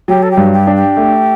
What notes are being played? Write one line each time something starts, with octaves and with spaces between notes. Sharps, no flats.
F#3 G4
A4
G4
G2
G4
D4
G4
A3